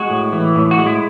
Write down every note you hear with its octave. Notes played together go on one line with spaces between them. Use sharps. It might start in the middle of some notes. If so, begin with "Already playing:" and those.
Already playing: G#3 F#4
A2
E3
A2
F#4
G#3
E4